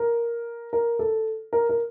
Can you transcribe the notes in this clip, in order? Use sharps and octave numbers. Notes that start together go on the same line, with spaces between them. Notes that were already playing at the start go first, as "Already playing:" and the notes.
Already playing: A#4
A#4
A4
A#4
A#4